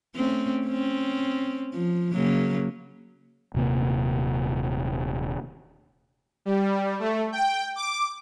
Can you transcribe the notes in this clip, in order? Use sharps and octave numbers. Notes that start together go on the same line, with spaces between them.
A3 C4 C#4
C4 C#4
F3
C#3 F#3 A#3
D#1 C3 A#3
G3
A3
G5
D6